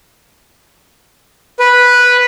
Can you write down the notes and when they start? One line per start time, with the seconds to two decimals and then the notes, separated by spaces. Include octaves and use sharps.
1.59 B4